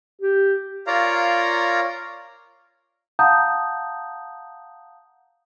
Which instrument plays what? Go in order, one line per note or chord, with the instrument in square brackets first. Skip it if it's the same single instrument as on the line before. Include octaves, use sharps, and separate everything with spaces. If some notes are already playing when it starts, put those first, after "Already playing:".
[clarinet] G4
[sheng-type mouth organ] F4 A#4 C#5 D5 F5 A#5
[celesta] F5 F#5 A5 A#5 D#6 G6